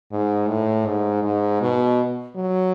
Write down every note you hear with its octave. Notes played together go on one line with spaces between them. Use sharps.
G#2
A2
G#2
G#2
B2
F#3